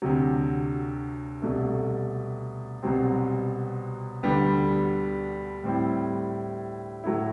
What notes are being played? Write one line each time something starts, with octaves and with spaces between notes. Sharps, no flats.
D2 C3 F#3
C2 B2 A3
C2 B2 F#3 C4
D2 D3 G3 B3
A2 G3 C4 E4
A2 F#3 A3 E4